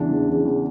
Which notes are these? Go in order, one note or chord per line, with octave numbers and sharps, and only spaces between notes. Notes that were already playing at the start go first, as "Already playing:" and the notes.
Already playing: E2 C#3 E3 D4
E2
C#3 E3
E2